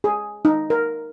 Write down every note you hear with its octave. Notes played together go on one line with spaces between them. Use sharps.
G#4
D#4
A#4